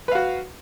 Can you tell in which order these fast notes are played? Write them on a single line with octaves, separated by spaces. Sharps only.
B4 F5 F#4